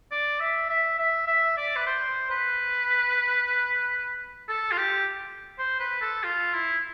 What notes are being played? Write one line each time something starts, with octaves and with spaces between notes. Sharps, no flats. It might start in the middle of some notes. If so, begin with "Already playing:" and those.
D5
E5
E5
E5
E5
D5
B4
C5
B4
A4
F4
G4
C5
B4
A4
F4
E4